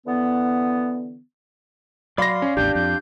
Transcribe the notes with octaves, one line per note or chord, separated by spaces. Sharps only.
D3 E3 B3
F#3 D5 F5 B5 C6 A#6
C#4
A1 E2 D4 G4 G6
F2 G6